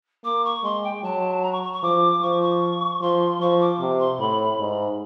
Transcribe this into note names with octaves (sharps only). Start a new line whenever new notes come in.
A#3 D6
C#6
G#3 C6
G5
F#3 A5
A#5
C#6
C#6
C#6
F3 D6
F3 C#6
C#6
F3 C6
F3 C#6
D6
C3
C6
A2 B5
G#2